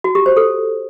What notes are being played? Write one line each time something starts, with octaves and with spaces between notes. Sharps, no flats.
F#4
G4
C5
A4